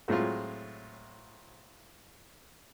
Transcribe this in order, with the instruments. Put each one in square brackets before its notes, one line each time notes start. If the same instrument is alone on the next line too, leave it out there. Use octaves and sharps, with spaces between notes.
[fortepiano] A2 F#3 G#3 C4 F4